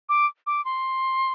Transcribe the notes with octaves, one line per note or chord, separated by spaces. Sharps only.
D6
D6
C6